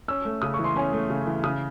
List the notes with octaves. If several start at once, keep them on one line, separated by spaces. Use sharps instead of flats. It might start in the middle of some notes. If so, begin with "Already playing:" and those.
C#4 E6
A3
C#3 D#6
C#6
E3
C6
C#4 G#5
A3
C#3
E3
C#3 D#6